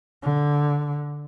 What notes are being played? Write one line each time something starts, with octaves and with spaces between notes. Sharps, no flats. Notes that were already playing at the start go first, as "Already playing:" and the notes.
D3